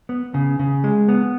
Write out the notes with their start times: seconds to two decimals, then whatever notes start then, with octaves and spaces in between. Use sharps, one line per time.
0.09 B3
0.34 C#3
0.59 C#3
0.84 G#3
1.09 B3